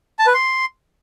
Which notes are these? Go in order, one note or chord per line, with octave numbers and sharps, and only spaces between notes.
A5
B4
C6